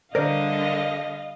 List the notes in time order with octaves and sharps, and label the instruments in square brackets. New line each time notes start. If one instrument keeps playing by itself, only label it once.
[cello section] D3 G3 [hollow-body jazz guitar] A#4 C5 D5 [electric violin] D#5 F5